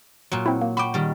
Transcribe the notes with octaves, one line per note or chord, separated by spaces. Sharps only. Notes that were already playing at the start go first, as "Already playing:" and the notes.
A#2 F#3
C4 E4
A#3
F#4 G5 B5 D6
D#3 G3